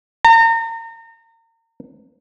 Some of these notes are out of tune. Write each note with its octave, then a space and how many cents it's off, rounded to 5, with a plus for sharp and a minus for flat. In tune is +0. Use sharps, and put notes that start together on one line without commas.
A#5 -35